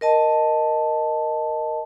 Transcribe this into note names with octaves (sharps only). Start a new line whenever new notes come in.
A#4 D#5 A5